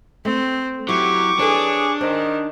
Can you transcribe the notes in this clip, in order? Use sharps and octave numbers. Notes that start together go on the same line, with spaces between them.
A3 C4
F#3 E4 G4 C#6 D6
D4 G#4 A4 B4 C#5
D#3 C5